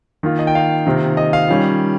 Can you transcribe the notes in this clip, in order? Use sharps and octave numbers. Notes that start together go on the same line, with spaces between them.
D#3 A#3 F4
D#5
G5
F5
C3 D#3 A#3 F4
D#5
F5
D#3 G3 C#4 F4